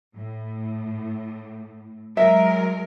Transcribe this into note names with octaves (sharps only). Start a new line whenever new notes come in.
A2
F#3 G#3 A#4 E5